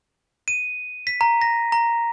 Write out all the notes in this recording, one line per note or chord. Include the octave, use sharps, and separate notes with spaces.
D#7
B6
A#5
A#6
A#5